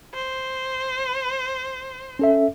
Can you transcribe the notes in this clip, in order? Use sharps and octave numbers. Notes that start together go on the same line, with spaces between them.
C5
C#4 A4 E5